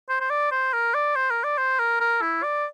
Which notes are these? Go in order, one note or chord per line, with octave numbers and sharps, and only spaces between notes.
C5
C5
D5
C5
A#4
D5
C5
A#4
D5
C5
A#4
A#4
E4
D5